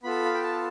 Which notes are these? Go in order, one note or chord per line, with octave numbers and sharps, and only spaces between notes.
B3 F4 A4 B5
F5
G5
A5